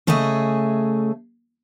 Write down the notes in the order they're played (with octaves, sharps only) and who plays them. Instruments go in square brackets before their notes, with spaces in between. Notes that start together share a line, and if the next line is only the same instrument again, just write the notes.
[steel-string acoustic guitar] C#3 A3 G#4 D#5 E5